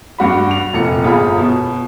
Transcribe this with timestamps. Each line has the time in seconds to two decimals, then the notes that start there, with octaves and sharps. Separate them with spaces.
0.18 G2 F#4 B5
0.51 F7
0.73 F1 A#2 C#7
1.03 G1 F4 G#4 F5 B5
1.38 B2